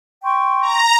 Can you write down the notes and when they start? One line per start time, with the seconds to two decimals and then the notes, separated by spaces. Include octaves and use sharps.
0.24 G5 C6 C#6
0.62 A#5